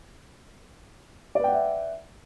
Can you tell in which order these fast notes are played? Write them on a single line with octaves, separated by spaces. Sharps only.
D5 B4 G5 F#5 E5